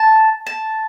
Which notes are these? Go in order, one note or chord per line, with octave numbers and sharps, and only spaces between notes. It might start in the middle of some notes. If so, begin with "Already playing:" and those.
Already playing: A5
A5